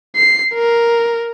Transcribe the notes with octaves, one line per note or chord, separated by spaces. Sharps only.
C7
A#4